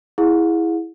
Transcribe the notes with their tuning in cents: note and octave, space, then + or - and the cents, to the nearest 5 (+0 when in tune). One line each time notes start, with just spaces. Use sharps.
E4 +0 G#4 -5 F#5 -45